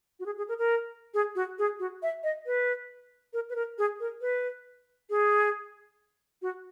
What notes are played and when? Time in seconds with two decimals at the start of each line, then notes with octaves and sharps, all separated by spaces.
0.20 F#4
0.26 G#4
0.38 G#4
0.49 A#4
0.59 A#4
1.14 G#4
1.35 F#4
1.59 G#4
1.79 F#4
2.03 E5
2.23 D#5
2.46 B4
3.33 A#4
3.50 B4
3.56 A#4
3.78 G#4
4.00 A#4
4.21 B4
5.10 G#4
6.42 F#4